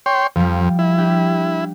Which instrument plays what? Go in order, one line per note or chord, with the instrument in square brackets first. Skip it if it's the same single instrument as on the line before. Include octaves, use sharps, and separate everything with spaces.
[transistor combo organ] C#5 G5 C6
[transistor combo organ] F2 [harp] F3 G3
[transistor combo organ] E4
[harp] D4 G4